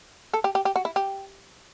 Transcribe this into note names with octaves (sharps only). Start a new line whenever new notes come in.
A4
G4
G4
G4
F#4
E4
G4